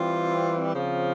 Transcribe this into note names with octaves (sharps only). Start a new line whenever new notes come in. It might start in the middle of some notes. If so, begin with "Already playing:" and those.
Already playing: E3 G3 C4 F4
C#3 F3 C4 F4